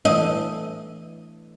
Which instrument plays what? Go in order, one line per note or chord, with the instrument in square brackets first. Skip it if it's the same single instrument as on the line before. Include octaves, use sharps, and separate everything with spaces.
[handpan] E3 A3 D4 [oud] D#5